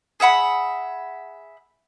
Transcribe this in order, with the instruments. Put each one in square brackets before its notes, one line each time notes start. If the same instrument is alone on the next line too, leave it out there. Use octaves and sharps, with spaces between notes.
[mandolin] G#4 E5 F#5 B5